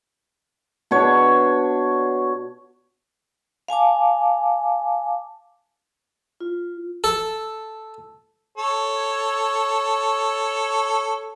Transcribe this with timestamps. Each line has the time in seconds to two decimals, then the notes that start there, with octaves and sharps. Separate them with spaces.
0.91 B2 D4 C#5
3.68 F5 G#5 A5 D6
6.40 F4
7.04 A4
8.58 A4 C#5